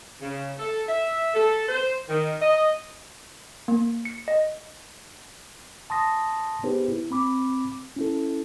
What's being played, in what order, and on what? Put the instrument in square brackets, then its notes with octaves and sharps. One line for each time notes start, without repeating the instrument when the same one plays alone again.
[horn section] C#3
A4
E5
A4
C5
D#3
D#5
[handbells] A#3
C#7
D#5
[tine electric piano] A5 C6 D#6 A#6
B3 D#4 G4 G#4 B4 C5
E4
C4 B5 D6
C#4 E4 A4